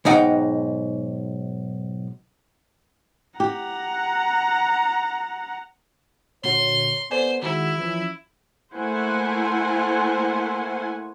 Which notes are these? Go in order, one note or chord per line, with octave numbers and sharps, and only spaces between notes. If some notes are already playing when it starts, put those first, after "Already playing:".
B1 G#2 D#4 F#5 G5
G4 F#5 A#5
A#2 D3 F#4 C#5 C6
B3 A4 C5 D5 G#5
D#3 G#3 E4 F#4
E3 F3 C#4
A3 A#3 E4 C5 F#5 G#5